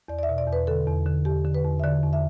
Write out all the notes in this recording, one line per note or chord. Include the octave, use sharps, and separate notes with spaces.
E2 D5
D5
E5
B2
D5
E2 B4
D3 A4
E2
D3
E2 G4
D3
B4
E2
E5
D3 D5
E2
E5